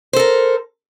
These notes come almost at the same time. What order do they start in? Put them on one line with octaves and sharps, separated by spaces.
C5 A4 A#4